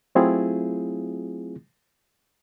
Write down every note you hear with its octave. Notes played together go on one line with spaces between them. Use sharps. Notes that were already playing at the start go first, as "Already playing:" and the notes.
F#3 A3 C4 E4 F4 G#4